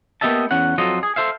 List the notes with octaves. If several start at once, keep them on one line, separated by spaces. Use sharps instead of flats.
A#3 B3 G4 D#5 E5 A5
E2 C#4 F#5
F2 F#3 F4 A4 D#5
G#4
A4 C5 E5 F5